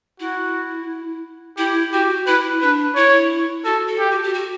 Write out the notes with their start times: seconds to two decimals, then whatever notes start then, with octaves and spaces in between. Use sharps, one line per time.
0.20 E4 F#4
1.58 E4 G4
1.92 F#4 G4
2.27 E4 B4
2.62 D4 B4
2.96 E4 C#5
3.65 F#4 A4
3.88 A4
3.99 G4
4.11 F#4
4.23 G4
4.34 F#4